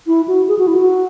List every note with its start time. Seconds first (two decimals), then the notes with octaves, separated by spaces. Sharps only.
0.07 E4
0.28 F#4
0.48 G#4
0.59 F#4
0.67 E4
0.76 F#4